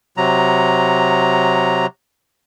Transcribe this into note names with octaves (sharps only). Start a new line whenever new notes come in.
C3 F#3 A#5